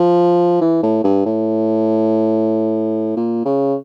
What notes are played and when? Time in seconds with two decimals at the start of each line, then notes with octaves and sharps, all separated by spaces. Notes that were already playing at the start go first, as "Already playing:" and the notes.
Already playing: F3
0.61 E3
0.83 A2
1.04 G2
1.26 A2
3.17 A#2
3.45 C#3